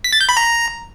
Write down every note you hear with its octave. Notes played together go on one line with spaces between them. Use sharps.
B6
A6
G6
B5
A#5